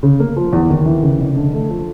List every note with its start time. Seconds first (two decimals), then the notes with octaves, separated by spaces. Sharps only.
0.03 C#3
0.20 A#3
0.36 F3
0.53 E2
0.70 D#2
0.86 E3
1.03 C#3
1.19 F1
1.36 D3
1.53 A3
1.70 F3